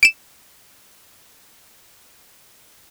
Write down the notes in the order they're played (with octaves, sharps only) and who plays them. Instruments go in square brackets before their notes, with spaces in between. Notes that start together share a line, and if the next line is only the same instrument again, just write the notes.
[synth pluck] D7 E7